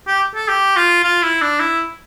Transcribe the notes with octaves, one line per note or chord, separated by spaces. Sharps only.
G4
A4
G4
F4
F4
E4
D4
E4